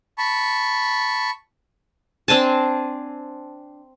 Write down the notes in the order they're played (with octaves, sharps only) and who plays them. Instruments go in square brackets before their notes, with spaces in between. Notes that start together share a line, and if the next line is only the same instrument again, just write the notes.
[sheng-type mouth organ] A5 B5 C#6
[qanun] C4 D4 G#5 A5